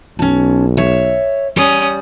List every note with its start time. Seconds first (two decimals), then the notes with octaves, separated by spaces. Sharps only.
0.19 B1 C#4 A5
0.77 C#5 E5
1.56 G3 C#4 D#6